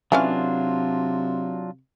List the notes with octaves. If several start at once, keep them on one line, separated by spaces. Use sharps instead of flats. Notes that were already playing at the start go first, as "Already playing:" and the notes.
C3 E3 F#3 C#4 D4 F4 F5